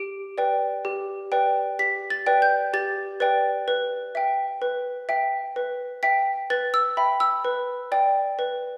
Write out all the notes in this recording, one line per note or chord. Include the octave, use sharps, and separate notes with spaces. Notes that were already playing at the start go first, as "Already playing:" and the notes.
Already playing: G4 D7
B4 D5 G5
G4
B4 D5 G5
G4 B6
A6
B4 D5 G5
G6
G4 A6
B4 D5 G5 A6
B4
E5 G5
B4
E5 G5
B4
E5 G5 B6
B4 A6
E6
E5 G5 B5
E6
B4
D5 G5
B4